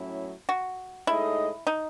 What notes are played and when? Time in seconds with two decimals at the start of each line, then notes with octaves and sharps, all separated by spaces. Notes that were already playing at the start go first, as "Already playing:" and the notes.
Already playing: A2 F#3 C#4 E4
0.49 F#4
1.07 A2 G#3 D#4 E4 A4 D#5
1.67 D#4